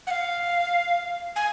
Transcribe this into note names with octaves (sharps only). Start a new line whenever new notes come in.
F#5
F5
G#5